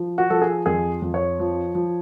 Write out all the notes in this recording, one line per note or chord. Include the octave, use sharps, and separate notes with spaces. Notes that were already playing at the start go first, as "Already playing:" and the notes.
Already playing: F3
F#4
F3 A4
G#4
F2 G#4
F2
C#5
F3
F3